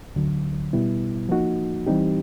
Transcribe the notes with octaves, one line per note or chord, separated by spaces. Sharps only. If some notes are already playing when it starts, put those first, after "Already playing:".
D2 D3 F#3
B2 G3 B3 E4
F3 A#3 D#4 F#4
E3 G3 C4 D#4 G4